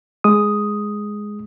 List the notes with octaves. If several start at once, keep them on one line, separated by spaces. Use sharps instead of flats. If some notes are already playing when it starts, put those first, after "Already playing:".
G#3 D#6